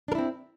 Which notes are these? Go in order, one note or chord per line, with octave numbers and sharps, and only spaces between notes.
C4 D4 E4 A#4